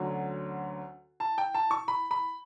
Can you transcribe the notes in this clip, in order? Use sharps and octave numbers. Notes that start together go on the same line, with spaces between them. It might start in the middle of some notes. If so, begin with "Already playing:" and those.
Already playing: D2 D3 F#3 C#4
A5
G5
A5
C#6
B5
B5